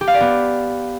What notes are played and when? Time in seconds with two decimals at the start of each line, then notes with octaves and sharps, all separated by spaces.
0.01 G4
0.07 F5
0.14 D5
0.21 B3